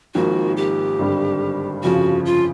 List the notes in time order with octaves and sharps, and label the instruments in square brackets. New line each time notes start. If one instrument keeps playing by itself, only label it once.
[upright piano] G#1 G#2 F3 A#3 [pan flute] F#4
[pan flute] G4
[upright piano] G#1 G2 D3 G3
[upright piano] G1 F2 C#3 F3 [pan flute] F#4
[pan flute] F4